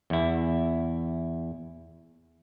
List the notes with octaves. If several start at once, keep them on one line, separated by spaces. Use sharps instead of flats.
E2 E4